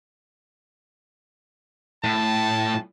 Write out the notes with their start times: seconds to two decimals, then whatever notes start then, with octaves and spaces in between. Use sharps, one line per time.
2.04 A2 A5